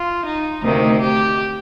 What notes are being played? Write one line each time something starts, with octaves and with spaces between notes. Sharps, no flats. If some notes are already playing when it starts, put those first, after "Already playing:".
Already playing: F4
D#4
D2 C3 D#3 A#3 D#4
G4